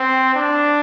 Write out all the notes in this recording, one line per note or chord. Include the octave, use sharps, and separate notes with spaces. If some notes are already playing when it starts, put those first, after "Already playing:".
Already playing: C4
D4